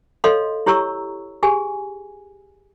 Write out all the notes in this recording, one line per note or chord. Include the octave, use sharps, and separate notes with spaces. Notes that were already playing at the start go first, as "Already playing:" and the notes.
A4 C#5 D#5 F5 C6
E4 G4 C#5 A#5 C#6 E6
G4 G#4 G#5